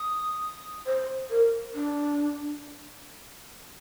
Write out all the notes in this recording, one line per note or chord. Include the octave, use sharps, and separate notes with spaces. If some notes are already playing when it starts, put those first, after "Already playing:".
Already playing: D#6
C5
A#4
D4